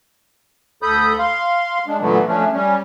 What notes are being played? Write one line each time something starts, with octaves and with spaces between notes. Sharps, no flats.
D2 A4 B5 D#6 G6
F5 C6
G#3 D4
A#2 D3 E3 F#3 A3 B3
F3 A3 C#4 D4
G3 C#4